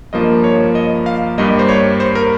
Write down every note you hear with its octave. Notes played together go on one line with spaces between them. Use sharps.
G2 F3 A#3 D#5
C#5
D#5
F5
G2 G3 A#3 D#5
C5
C#5
C5
A#4